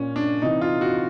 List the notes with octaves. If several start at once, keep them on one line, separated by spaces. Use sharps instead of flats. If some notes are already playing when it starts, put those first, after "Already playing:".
Already playing: A#2 C#4
D4
C3 E3 D#4
F4
F#4